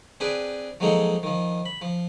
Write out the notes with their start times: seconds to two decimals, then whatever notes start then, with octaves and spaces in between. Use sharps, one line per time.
0.20 C4 D4 G#4 B4 G5
0.80 F3 F#3 G#3 A#3 D#4 A4
1.23 D#3 F3
1.66 B5
1.82 F3